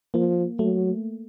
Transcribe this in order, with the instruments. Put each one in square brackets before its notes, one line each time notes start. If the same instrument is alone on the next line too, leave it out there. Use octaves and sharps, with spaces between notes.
[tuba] F3 [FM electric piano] A#3
[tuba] F#3 [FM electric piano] A3